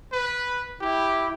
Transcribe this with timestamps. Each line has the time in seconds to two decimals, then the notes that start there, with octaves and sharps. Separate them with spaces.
0.12 B4
0.81 E4 G4